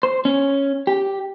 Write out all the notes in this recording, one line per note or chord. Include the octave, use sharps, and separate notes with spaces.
C5
C#4
G4